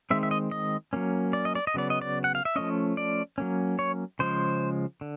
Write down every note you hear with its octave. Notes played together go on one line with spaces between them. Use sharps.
D#3 G#3 C4 E5
E5
D#5
D#5
F#3 A#3 C#4
D5
D#5
D5
D#5
C#3 F#3 B3 D5
D#5
D5
F#5
F5
E5
F3 A3 C#4 D#5
D5
F#3 A#3 C#4
C#5
C#3 F3 G#3 C5
D3